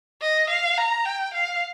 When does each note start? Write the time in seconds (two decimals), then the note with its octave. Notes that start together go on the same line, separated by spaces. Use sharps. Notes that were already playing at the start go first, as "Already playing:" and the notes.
0.21 D#5
0.50 F5
0.77 A#5
1.05 G5
1.34 F5